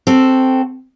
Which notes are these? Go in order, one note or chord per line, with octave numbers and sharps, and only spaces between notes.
C4 F#4 A4